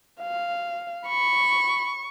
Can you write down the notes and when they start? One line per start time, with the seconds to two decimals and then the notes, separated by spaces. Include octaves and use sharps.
0.21 F5
1.07 B5 C#6